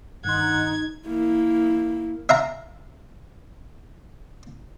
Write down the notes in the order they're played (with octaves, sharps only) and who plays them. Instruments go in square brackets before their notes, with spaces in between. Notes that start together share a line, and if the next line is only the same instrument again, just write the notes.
[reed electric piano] G2 D#3 C6 [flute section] D#4 [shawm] F#5 [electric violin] G#6
[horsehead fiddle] A#3 E4
[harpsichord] E5 F5 A#5